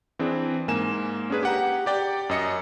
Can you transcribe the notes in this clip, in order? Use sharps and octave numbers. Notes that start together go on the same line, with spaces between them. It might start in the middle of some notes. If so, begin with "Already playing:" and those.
E3 C4 D4 G#4
G#2 A#3 G#5 E7
C#4 D4 G#4 B4
G4 F#5 A#5
G4 D5 G5
F#2 D#5 C#7